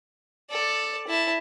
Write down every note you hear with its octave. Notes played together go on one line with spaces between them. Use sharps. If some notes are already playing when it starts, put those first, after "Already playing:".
A4 D5
E4 A5